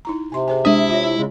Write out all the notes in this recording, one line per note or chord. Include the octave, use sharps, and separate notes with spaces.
D#4 E4 A#5
C3 G#5 C6
G#4 C5 G#5
G#3 D4 E4 E5 D#6
F4 C#5
C#3 G#3